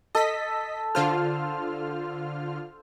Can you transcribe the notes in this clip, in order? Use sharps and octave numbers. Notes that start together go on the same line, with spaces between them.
A4 D#5 B6
D3 F4 C5 F6